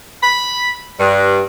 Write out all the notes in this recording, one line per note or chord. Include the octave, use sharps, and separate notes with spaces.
B5
G2